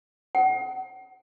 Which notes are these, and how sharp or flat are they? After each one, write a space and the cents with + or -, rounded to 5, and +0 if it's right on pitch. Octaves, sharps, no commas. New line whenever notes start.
F#5 +30